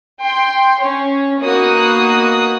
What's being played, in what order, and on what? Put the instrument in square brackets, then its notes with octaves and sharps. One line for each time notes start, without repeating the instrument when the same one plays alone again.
[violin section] G5 C6
C#4 C#5
A#3 B3 D#4 F#4 D#6 F#6